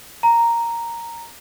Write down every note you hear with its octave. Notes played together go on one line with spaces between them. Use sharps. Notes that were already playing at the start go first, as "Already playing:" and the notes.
A#5